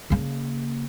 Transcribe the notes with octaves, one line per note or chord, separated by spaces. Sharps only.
C#3 A#3